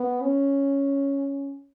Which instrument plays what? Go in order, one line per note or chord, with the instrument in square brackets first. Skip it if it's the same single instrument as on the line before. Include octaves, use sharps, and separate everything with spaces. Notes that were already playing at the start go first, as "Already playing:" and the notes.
Already playing: [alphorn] B3
C#4